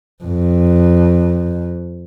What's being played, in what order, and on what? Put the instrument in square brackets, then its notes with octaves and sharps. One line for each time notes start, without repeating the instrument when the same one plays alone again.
[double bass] F2